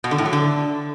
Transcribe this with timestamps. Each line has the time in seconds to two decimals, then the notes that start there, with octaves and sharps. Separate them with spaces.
0.04 B2
0.11 D3
0.18 A2
0.26 F#3
0.33 D3